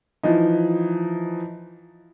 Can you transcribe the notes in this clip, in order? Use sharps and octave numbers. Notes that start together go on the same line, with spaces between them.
E3 F3 D#4